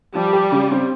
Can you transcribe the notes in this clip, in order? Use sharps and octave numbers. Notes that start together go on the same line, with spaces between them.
F3 G3
G4
C#3
C4